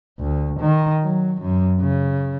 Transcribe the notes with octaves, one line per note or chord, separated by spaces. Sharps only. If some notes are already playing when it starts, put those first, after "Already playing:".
D2
D#3
F#3
F#2
C#3